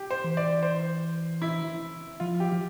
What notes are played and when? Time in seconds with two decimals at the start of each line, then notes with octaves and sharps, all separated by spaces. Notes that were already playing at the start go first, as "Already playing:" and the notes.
Already playing: G4
0.11 C5
0.24 E3
0.37 D5
0.63 C5
1.42 E4
2.20 F3 F4
2.40 G4
2.52 F3